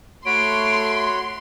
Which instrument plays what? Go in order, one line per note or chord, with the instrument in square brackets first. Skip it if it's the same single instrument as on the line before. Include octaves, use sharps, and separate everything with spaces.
[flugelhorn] A3 [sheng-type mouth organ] F#4 C#5 B5 [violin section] C6 [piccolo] D7